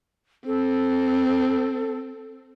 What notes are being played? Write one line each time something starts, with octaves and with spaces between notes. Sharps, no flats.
C4 A4